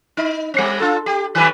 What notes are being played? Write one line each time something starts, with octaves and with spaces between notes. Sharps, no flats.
D#4
G3 C4
D4 F4 A4
G4
D#3 G3 B4